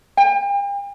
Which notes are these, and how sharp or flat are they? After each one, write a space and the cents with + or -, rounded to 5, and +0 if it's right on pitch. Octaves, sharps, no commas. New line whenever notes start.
G5 +40